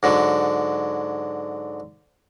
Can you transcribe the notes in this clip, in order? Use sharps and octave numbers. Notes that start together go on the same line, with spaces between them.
G#2 D3 F#3